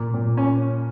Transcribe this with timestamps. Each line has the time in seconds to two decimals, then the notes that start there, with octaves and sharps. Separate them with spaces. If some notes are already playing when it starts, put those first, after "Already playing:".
Already playing: A#2
0.14 A#2
0.37 C#4